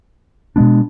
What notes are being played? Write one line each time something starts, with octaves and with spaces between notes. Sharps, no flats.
B2 G#3 B3 D4